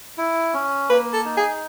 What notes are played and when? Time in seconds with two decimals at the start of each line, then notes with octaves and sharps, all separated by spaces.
0.18 E4
0.54 C#4
0.90 A#3 B4
1.13 A4
1.25 D#4
1.37 G#4